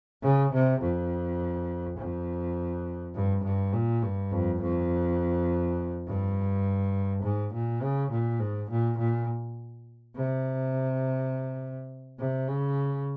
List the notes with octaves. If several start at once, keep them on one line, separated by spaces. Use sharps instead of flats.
C#3
C3
F2
F2
G2
G2
A#2
G2
F2
F2
G2
G#2
A#2
C#3
A#2
G#2
A#2
A#2
C3
C3
C#3